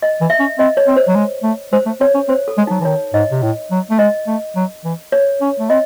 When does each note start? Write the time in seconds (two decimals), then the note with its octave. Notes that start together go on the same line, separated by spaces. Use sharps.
0.02 D#5
0.21 E3
0.30 E5
0.40 C#4
0.59 C4 D#5
0.77 C#5
0.87 C4
0.96 C5
1.08 F#3
1.15 G#3
1.43 A3
1.72 G#3 C5
1.86 A3
2.00 C4 C#5
2.15 C#4
2.28 C4 C5
2.48 A4
2.58 G#3
2.67 F#3 D#4
2.80 E3
2.85 D#3 C#5
3.14 G#2 D#5
3.31 C3
3.43 A2
3.71 F#3
3.90 A3
3.99 G#3 D#5
4.28 A3
4.56 F#3
4.85 E3
5.12 C#5
5.41 C#4
5.59 A3
5.70 C4 D#5